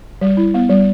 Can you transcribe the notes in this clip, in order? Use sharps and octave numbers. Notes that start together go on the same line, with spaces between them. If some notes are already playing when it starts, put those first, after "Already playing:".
G3
E4
B3
G3